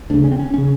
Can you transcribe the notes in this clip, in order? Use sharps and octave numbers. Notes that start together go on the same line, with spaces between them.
D2 C#3 D4
C#4
C4
C#4
C#3 C#4